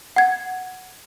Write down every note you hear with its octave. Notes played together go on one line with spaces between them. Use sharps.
F#5 G#6